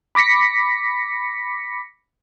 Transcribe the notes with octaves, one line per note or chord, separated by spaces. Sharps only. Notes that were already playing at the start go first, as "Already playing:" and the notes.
B5 D6 A#6 B6 C#7